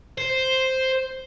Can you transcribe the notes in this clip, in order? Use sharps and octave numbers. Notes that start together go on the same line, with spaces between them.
C5